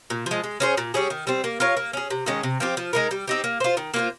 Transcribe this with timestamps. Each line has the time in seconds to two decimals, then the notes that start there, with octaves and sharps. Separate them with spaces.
0.10 A#2
0.26 F3 G#3
0.44 G#3
0.60 C#4 G#4 C5
0.77 A#2
0.94 G3 C#4 G#4
1.10 D#3
1.27 G3 C4
1.44 A#3
1.60 F4 A#4 C#5
1.77 A#3
1.93 C#4 G#4
2.10 C3
2.26 D#3 G#3 C#4
2.43 C3
2.60 F3 C4 G4
2.77 F3
2.93 G#3 D#4 A#4
3.11 G3
3.28 C4 D#4 G4
3.44 A#3
3.60 F4 C5
3.77 D#3
3.94 A#3 F4 C5